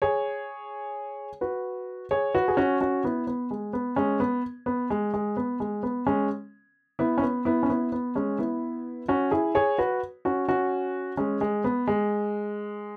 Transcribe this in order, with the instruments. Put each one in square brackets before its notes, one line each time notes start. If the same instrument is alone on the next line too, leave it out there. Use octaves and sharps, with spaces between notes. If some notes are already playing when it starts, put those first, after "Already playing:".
[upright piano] G#4 C#5
F#4 B4
G#4 C#5
F#4 B4
G#4
C#4 F#4
C#4 F#4
B3 E4
B3
G#3
B3
G#3 C#4
B3
B3
G#3
G#3
B3
G#3
B3
G#3 C#4
B3 E4
C#4
B3
B3 E4
C#4
B3 E4
B3
G#3 C#4
B3 E4
C#4 F#4
E4 G#4
G#4 C#5
F#4 B4
C#4 F#4
C#4 F#4
G#3 C#4
G#3
B3
G#3